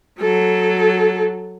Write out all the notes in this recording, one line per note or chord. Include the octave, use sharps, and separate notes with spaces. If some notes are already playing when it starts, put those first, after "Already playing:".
F#3 A4